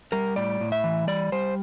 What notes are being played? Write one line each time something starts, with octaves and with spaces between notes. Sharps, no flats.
G3 A#4
A2 D5
A2
E5
E3
G3 D5
G3 C5